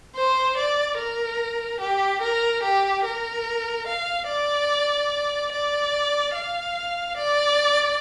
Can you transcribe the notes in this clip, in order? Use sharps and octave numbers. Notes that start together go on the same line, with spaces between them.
C5
D5
A#4
G4
A#4
G4
A#4
F5
D5
D5
F5
D5